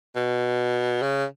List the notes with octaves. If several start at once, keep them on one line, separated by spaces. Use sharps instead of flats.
B2
C#3